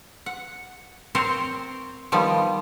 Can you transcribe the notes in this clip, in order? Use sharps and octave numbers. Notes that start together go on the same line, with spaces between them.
F#5
C4 A#4 C5 C#5
D#3 F3 G3 B3